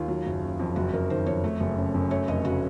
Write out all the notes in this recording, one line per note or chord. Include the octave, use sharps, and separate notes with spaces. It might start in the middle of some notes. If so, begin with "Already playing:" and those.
Already playing: D#2 F4
F#3
F#1
C#3
F2
F#1 F#4
F#1 A#4
D#3 C5
F2 C#5
A3
F#1
C#3
F#2
A3 C#5
F1 D#5
C#3 F#4